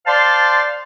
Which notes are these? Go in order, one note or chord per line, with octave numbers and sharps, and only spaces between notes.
C5 D5 F5 A5 C6